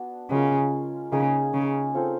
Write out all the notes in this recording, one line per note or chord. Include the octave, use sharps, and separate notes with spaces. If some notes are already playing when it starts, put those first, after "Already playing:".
Already playing: B3 D4 F#4
C#3 G#3 C#4 F4 A#4
C#3 A#3 D#4 G#4
C#3
C4 F4 A4 C#5